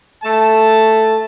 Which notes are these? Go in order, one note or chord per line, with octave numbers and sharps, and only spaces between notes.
A3 A5